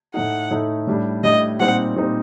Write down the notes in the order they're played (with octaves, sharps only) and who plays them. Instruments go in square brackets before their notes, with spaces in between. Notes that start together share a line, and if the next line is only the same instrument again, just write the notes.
[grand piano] A2 A3 D#4 [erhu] F#5
[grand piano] A2 A3 D#4
A2 G3 D4
[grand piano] A2 G3 D4 [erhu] D#5
[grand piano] A#2 G3 C4 D#4 [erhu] F#5
[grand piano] A#2 G3 C4 D#4